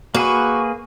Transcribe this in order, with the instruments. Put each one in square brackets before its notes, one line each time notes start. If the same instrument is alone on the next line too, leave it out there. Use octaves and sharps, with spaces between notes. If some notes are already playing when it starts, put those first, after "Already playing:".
[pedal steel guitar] A#3 G#4 B4 [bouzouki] F#4